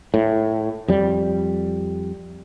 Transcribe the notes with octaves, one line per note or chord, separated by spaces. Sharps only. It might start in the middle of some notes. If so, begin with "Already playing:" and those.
A2
F2 G3